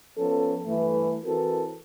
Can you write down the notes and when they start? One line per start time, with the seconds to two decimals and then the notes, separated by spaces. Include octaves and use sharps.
0.17 F3 B3 C#4 A4
0.65 G2 E3 A3
1.24 E3 C4 F#4 A4 A#4